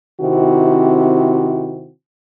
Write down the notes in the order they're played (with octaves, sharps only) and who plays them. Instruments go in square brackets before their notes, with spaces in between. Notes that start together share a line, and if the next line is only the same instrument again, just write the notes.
[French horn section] C3 D#3 C4 E4 F#4